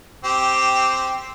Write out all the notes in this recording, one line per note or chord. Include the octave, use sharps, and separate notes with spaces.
C4 G4